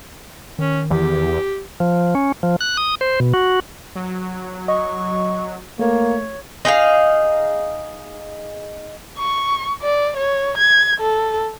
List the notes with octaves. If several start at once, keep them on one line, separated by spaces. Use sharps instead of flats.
D#3 C#4
E2 G4
F3
C#4
F3
F#6
D#6
C5
B2
F#4
F#3
D#5 C#6
A3 A#3 C#5
D#4 G#4 A#4 F5
C#6
D5
C#5
G#6
A4